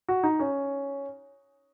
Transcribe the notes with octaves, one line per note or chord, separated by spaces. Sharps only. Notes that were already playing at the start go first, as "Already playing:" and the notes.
F#4
D#4
C#4